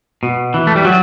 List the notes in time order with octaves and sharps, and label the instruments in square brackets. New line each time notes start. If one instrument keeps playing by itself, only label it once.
[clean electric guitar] B2
E3
A3
G3
F#3